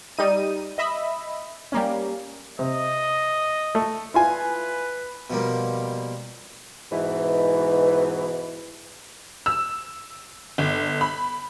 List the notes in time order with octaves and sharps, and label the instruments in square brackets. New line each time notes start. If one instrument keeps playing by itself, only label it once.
[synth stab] G3 D#4 D#7
D#5 E5 B5
G3 A#3 C#4
[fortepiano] C3 [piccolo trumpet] D#5
[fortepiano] A3
[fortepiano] E4 F4 G#5 [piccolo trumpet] B4
[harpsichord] B2 F3 G3 A#3
[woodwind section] G#2 B2 E3
[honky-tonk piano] E6
G1
B5